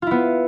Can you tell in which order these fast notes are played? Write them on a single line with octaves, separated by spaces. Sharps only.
F4 E4 B3